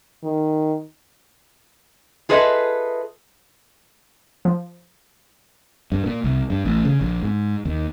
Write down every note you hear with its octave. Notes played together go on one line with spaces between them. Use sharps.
D#3
F4 G#4 A4 B4 D#5 E5
F3
G2
A#2
C2
G2
A1
C#3
A#1
G#2
D#2